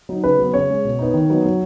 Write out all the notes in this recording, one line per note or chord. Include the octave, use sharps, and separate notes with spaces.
F#3 D#4
C#3 B4
F#3 B3
C#3 C#5
G#3 C#4
B2
B3 D#4
D#3
F#3 B3 D#4
F#3